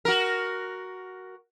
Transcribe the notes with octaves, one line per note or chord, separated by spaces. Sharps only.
F#4 A#4